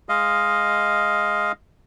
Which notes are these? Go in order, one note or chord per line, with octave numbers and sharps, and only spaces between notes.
G#3 D#5 F5